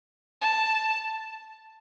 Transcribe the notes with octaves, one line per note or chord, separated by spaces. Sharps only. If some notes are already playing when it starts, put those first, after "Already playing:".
A5